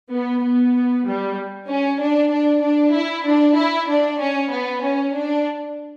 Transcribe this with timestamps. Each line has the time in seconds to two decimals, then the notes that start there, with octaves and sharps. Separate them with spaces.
0.11 B3
0.42 B3
1.05 G3
1.68 C#4
2.00 D4
2.31 D4
2.63 D4
2.94 E4
3.25 D4
3.57 E4
3.88 D4
4.20 C#4
4.51 B3
4.83 C#4
5.15 D4